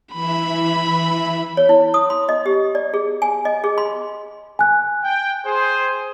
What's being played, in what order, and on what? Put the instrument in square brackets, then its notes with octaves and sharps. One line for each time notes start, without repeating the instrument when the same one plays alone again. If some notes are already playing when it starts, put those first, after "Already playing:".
[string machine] E3 E5 [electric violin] B5
[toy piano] C#5
E4
D#6
C6
D#5
G4
D5
G#4
G#5
D#5
G#4
C6
[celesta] G#5 F#6
[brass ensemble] G5
G#4 C5